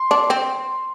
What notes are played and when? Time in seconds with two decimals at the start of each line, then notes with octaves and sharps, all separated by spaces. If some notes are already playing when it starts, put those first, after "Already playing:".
Already playing: C6
0.11 D4
0.30 C4